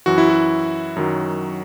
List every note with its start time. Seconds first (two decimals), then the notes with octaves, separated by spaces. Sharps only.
0.06 F#2 E3 F#4
0.18 E4
0.30 F#4
0.97 F#2 D#3 F#3